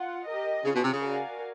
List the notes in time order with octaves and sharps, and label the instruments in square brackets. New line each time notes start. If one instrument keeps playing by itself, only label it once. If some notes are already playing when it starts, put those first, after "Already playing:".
Already playing: [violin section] F4 F#5
G4 A#4 D#5
[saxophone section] C#3 [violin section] C#4 F4 G#4
[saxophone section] B2
C3
C#3
[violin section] F#4 A#4 D5 F5 G#5